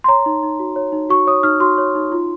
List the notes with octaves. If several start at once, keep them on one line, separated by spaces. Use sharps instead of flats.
C6
C#5 A#5
D#4
D#4
F#4
C#5
D#4
F#4 C#6
C#5 D#6
D#4 F6
F#4 C6
C#5
D#4
F4